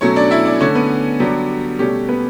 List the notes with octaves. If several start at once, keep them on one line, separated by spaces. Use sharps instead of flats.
B2 F#3 A3 C#4 C#5
D4 D5
E4 E5
D4 D5
D3 A3 C#4 C#5
B3 B4
D3 F#3 G3 B3 G4
B2 G3 A3 C#4 G4
B3 B4